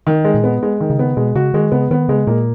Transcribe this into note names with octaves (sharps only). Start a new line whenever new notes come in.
D#3
G#3
A#2
B3
G#3
D#3
C#3
B3
B2 G#3
C#3 F#4
D#3 G#3
C#3 B3
D#3 B3
C#3 G#3
A#2 A#3